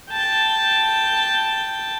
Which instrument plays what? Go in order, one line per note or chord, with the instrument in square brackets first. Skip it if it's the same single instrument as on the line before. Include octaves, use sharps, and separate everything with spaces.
[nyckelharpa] G5 A5